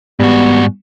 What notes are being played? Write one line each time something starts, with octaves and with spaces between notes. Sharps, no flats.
G#2 G3 B3 F#4